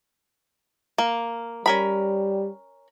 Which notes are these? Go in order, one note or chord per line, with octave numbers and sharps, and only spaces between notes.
A#3
G3 C#4 A#4 B5